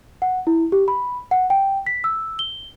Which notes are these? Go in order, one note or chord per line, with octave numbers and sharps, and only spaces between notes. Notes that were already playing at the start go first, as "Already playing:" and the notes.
F#5
E4
G4
B5
F#5
G5
B6
E6
G7